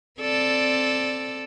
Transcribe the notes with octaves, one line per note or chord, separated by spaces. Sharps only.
C4 A4 D5